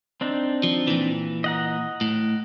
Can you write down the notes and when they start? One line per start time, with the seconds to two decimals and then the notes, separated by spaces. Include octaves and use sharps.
0.21 C4 D4 D#4
0.63 F3
0.87 A#2 E3
1.44 D#5 F#5 A#5
2.01 A2